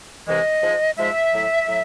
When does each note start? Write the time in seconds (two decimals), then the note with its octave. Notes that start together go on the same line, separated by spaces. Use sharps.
0.27 C2 C3 E3 G#3 D#5
0.62 G#2 F3 G#3
0.97 G#2 F3 G#3 E5
1.33 A2 F#3
1.68 A2 F#3